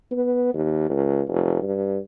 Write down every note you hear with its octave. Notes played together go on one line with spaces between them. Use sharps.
B3
D#2
C#2
F1
G2